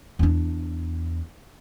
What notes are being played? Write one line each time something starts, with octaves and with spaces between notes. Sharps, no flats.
E2 D4